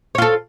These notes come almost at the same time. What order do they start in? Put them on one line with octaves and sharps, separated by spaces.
C#5 F4 A4